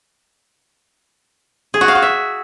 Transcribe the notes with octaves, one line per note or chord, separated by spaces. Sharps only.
G#4
F#4
F5
F#4
E5